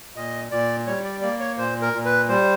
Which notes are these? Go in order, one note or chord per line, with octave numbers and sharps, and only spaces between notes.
A#2 D#5
A#2 D5
G3 C#5
D5
A#3 D5
C#5
A#2 C5
A#4
A#2
B4
G3 C5